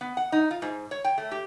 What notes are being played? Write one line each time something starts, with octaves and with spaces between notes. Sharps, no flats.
B3
F#5
D#4
F4
G#2
C#5
G5
A3
G4